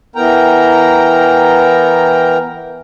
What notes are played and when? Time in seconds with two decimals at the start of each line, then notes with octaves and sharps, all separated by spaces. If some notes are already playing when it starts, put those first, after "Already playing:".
0.16 E3 B3 A#4 G5 A#5